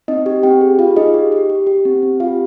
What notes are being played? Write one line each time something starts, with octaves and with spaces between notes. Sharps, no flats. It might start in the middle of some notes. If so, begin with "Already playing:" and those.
C4 D#4 D#5
G4
C4 G4 G5
G#4
F4 F5
D#4 G#4 D#5
G4
G4
G4
G4
C4
C4
F4 G4 F5